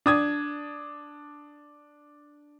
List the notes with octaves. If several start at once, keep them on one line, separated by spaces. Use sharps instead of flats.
D4 D#6 G#6